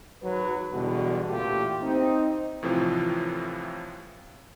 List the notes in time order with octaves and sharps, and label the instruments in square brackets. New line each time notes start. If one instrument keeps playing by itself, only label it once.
[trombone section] G#1 F#3 B4
B1 E2 B2 D3 G3 F#4
A1 A#2 A3 F4 G4
C4 D#4
[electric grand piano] A2 C3 E3 F3 C4 F4